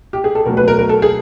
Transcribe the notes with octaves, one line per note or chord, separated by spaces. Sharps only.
G4
G#4
A4
B2 F#3 A3 A#4
B4
A#4
A#4
A4
G#4